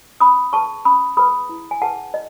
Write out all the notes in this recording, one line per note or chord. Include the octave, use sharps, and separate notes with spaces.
C#4 B5 D#6
G#4 B4 A5 C#6
C#4 B5 D#6
G#4 B4 B5 D#6
E4
G#5
G#4 B4 F#5 A5
D#5